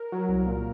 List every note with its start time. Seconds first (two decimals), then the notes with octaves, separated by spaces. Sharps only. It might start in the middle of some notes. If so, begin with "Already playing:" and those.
Already playing: A#4
0.12 F#3
0.28 C2
0.46 A#2